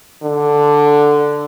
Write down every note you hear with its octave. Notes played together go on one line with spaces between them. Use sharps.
D3